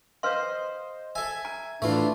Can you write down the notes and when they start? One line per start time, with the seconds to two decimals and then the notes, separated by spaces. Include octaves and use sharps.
0.23 B4 C5 D#5 F5 C6
1.15 A4 E5 G#5 G#6
1.45 A#5
1.82 A2 E3 A3 D4 F4